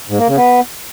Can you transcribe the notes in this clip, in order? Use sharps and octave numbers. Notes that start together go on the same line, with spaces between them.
G#2
A#3
C#3
B3